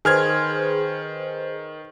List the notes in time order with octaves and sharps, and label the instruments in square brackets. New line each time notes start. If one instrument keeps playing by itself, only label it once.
[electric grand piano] D#3 F6 G#6 [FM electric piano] G#4 B4 C5